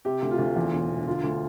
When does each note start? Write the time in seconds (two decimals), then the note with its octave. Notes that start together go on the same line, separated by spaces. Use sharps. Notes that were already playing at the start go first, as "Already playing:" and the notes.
0.05 C3 G4
0.22 D2
0.31 F4
0.39 D2
0.56 E2
0.73 E1
0.90 E1
1.07 D3 F4
1.24 D2